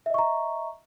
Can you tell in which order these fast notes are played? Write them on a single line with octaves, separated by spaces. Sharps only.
E5 D#5 C#6 A#5